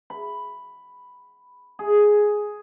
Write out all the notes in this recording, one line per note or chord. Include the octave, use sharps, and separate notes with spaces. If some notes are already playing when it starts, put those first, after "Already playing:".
B5
G#4